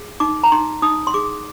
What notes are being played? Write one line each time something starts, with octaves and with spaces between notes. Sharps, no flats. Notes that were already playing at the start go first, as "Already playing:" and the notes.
Already playing: G#4
D#4 D6
A#5
D#4 C6
D#4 D#6
C6
G#4 D6